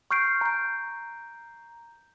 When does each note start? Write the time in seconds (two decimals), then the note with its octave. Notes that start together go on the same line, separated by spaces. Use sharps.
0.11 C#6 F6 G6 C7 D7
0.41 A#5 G6